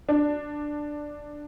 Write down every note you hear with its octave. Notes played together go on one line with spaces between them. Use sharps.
D4